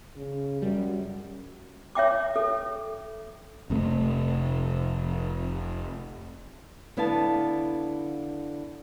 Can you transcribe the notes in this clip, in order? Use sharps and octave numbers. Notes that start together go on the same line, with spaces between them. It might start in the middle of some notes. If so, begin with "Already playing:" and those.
C#3
F#2 G3
C#5 E5 G5 D6
A4
F1 C3 A3
D3 B3 E4 F5 A5